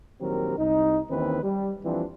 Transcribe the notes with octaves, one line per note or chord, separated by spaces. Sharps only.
A#1 D#3 F#3 C4 G4 A#4
C2 D#4
D#2 D#3 E3 C4 C#4 B4
G3
F2 E3 F3 G3 C4 D4